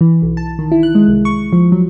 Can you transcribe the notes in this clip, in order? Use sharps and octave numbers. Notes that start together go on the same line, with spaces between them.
E3
B1
A5
D#3
E4
F#6
G#3
C2
C#6
F3
F#3